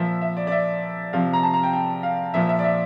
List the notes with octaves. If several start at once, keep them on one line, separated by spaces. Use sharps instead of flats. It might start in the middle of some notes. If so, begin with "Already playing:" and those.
Already playing: A#2 F3 E5
E5
D5
D5
E5
C3 F3 F5
A#5
A5
A#5
G5
G5
F5
A#2 F3 E5
E5
D5
E5